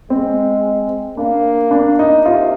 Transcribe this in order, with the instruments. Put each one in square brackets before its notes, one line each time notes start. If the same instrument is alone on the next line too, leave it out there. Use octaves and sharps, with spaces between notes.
[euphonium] G#3 [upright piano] C4
[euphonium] A#3 [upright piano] D4
[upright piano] D4
D#4
[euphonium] C3 [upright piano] F4